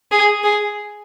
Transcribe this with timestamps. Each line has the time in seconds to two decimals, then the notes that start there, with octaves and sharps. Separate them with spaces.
0.11 G#4
0.44 G#4